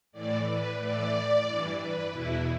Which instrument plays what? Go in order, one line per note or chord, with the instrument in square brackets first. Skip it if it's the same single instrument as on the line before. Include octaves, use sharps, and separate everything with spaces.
[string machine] A2 E3 D5
B4
A2 E3 D5
G2 E3
B4
E2 B2 E4